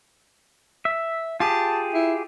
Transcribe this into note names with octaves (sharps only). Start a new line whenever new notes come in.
E5
F4 G4 G#4 A5
E4